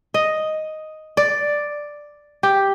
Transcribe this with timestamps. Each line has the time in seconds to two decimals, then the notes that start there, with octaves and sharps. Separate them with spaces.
0.14 D#5
1.17 D5
2.43 G4